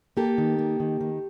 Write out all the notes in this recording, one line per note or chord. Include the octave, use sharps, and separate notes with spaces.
A#3 G4 A4
D#3
A#3
D#3
D#3